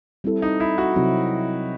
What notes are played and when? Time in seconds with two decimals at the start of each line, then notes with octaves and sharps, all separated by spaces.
0.24 G3 C4 E4 A4
0.42 D#4
0.60 E4
0.78 F#4
0.95 C3 F#3 C4 E4